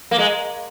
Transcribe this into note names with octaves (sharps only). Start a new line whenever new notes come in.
A#3
G#3